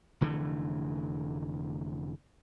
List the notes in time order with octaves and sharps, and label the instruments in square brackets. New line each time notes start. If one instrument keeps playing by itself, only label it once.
[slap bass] F1 D3 E3 A3